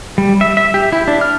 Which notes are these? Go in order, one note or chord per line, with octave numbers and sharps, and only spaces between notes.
G3
E5
E5
G4
E4
D4
F6